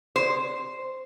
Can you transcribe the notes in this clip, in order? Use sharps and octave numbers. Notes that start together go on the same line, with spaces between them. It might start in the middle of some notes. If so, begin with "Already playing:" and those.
C5